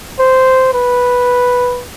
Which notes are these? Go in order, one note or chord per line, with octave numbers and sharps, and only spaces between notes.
C5
B4